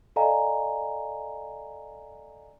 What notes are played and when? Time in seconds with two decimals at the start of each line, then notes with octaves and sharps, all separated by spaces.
0.16 A4 D5 D#5 F5 G#5 A#5